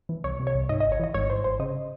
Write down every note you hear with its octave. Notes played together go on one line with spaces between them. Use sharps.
E3
C2 C#5
C3
C#5
C2
G#2 D#5
D#5
G#1
C#5
E3 D#5
G#1 C#5
G#2 C5
G#1 C5
C#3 D#5